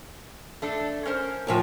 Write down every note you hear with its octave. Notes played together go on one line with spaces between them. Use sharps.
A3 D4 A4
C#4 A#4 C5
D2 A2 F3